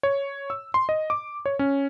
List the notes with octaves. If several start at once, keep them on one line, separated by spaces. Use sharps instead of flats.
C#5
E6
C6
D#5
D6
C#5
C#4